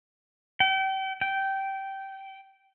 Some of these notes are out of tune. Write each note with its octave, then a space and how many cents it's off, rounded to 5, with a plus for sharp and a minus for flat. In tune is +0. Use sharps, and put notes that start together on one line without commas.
G5 -35
G5 -15